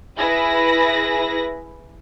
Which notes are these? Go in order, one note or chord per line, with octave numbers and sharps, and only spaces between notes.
E4 G#4 B4 A#6